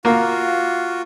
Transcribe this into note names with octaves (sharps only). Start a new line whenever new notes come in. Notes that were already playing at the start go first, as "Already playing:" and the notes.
A#3 F4 F#4